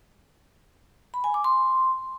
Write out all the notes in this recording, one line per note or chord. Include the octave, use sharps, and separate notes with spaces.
B5
G#5
D6
C6